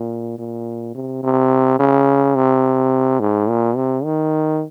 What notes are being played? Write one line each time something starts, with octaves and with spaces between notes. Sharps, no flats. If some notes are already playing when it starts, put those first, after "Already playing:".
Already playing: A#2
A#2
C3
C3
C#3
C3
G#2
A#2
C3
D#3